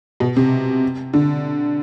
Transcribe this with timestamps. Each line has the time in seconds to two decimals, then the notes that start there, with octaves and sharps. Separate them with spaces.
0.20 B2
0.37 C3
1.14 D3